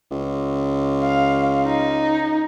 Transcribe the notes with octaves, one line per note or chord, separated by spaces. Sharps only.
C#2
F5
D#4